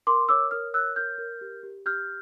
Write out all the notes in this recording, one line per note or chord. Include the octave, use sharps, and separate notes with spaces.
A#4 C6 D6
C#5 D6 E6
A#4 D#6 F6
C#5 E6 F#6
A#4 F6 G6
A#4
G4
G4
G4 F6 G6